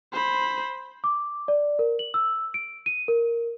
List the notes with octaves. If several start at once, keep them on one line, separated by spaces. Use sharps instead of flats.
C5 B5
D6
D5
A#4
F#7
E6
D7
D#7
A#4